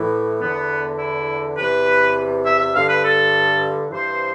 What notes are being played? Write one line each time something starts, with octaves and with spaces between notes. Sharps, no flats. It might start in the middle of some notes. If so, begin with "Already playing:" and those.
Already playing: A2 E3
E2 D3 B3
E4
E2 C3 E3 B4
E5
E5
G2 D3 F5
B4
A4
G2 E3 C5